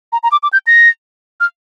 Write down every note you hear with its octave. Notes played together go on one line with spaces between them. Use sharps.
A#5
A#5
D6
D6
G6
A#6
F6